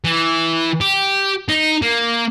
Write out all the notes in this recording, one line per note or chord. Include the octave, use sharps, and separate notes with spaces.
E3
G4
D#4
A#3